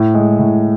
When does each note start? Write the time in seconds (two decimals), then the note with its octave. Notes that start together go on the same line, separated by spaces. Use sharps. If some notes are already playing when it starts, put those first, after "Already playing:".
Already playing: A2
0.14 G#3
0.39 A2